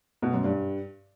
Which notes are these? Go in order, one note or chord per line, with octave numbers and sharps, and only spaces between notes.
B2
F#2
G2